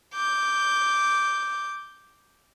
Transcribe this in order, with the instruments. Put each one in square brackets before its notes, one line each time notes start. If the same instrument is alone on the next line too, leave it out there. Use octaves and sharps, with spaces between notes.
[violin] D6 G6